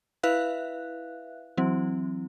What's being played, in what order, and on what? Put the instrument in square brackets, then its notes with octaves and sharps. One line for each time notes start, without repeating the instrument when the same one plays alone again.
[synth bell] E4 B4 E5 F5 F#6
E3 F#3 C4 E4